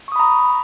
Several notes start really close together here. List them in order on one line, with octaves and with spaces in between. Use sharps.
C#6 D#6 B5 A#5